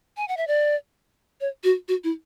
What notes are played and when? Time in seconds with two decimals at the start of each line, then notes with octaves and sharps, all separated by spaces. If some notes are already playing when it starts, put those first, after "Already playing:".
0.17 G#5
0.28 F#5
0.37 E5
0.48 D5
1.41 C#5
1.64 F#4
1.88 F#4
2.04 E4